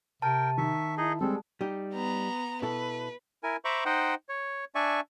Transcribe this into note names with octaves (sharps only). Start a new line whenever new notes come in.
C3 A#4 G5 A5
D#3 E5 C#6
D#4 E4 G#4 D#5
G3 G#3 C4 A4
G3 D#4 G4
B3 A#5
B2 E4 A4 B4
E4 A#4 G#5
C5 E5 A#5 B5 C#6 D6
D#4 C5 D#5 F#5 G5
C#5
D4 D5 E5 G#5 C#6